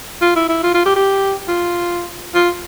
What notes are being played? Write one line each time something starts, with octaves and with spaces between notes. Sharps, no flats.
F4
E4
E4
F4
F4
G4
G4
F4
F4